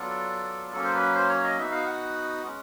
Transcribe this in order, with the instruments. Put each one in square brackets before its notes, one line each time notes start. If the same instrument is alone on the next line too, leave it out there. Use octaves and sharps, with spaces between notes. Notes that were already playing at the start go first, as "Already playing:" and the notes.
Already playing: [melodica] F#3 B3 D4 F4 A4
F#3 A#3 C#4 A4
C5
B4
C5
C#5
D#5
B3 D#4 F#4 E5
F5
F#5
G#3 C#4